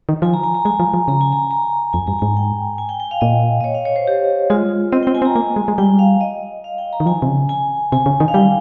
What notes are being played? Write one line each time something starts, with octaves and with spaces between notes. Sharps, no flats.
D#3
F3 G#5
A#5
G#5
A#5
G#3 G#5
F3
F3
C#3 A#5
G#5
A#5
A#5
F2 G#5
G2 A#5
G#2 G#5
G5
G#5
G5
G5
F5
A#2 D#5
D#5
C#5
F5
C#5
C5
G4
G#3 F4
C4 D#5
G5
C4
G#5
C4
A#5
A#3 G#5
G#3
G#3
G3 G5
F5
D#5
F5
G5
A#5
D#3
F3 G#5
C3
C#3
G#5
C3 G#5
C#3
D#3
F5
G3 G5